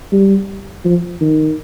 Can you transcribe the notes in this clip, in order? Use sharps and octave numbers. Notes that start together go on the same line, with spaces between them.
G3
F3
D#3